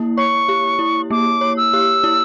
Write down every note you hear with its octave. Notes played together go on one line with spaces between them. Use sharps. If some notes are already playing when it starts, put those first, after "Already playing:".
Already playing: A#3 E4
C#5 C#6
G4
E4
A#3 D6
C#5
E6
G4
E4